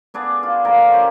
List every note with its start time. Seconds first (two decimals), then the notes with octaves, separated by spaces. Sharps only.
0.14 B3 D4 G#4 D5
0.43 F4
0.65 D3 F3 A#3 A#4
0.92 C#4 G4 C#5 C6